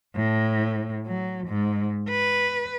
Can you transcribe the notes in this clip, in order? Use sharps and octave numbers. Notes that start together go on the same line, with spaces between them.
A2
F#3
G#2
B4